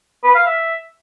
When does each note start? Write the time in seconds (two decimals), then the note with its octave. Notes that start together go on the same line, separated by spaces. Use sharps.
0.24 B4
0.35 F5
0.46 E5